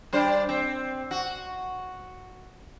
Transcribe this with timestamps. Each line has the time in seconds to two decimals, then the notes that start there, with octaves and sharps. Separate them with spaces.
0.13 G3 D4 C5
0.49 C4
1.11 F#4